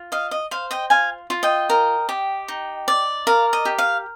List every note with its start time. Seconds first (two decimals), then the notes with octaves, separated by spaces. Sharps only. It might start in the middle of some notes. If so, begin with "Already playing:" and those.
Already playing: F4
0.12 D#5 F5
0.31 D#5
0.51 C5 F5
0.71 D#5 G5
0.90 F4 F5 G#5
1.30 F4
1.43 D#5 G5
1.70 A#4
2.09 G4
2.48 D#4
2.88 D5
3.27 A#4 F5
3.53 D#5
3.65 G4
3.78 F5